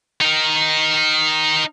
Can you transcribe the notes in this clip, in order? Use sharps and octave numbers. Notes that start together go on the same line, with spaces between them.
D#4 A#4